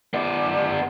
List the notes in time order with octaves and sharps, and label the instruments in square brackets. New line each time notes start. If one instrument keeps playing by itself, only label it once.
[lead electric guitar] B3 D5